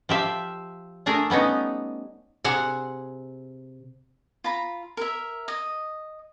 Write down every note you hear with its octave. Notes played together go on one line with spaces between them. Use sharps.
F3 G4 E5 F5
A3 D4 G#4 A#4
G3 B3 C#4 D#4
C3 G#4 F#5
F4 A#5 B5
A#4 E5
D#5